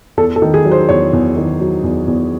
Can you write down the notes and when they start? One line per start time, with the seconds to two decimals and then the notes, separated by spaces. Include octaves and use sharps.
0.17 E2 A4
0.36 A4
0.42 D#3
0.54 G#4
0.65 F#3
0.72 C5
0.89 E2 C#5
1.13 E2
1.36 D#3
1.60 F#3
1.83 E2
2.08 E2